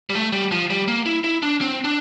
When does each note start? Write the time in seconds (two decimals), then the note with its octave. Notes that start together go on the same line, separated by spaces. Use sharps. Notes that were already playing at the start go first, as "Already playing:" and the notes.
0.10 G3
0.15 A3
0.33 G3
0.52 F3
0.70 G3
0.88 A#3
1.06 E4
1.24 E4
1.43 D4
1.61 C4
1.85 D4